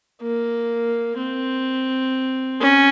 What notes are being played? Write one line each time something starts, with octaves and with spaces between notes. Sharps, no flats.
A#3
C4
C#4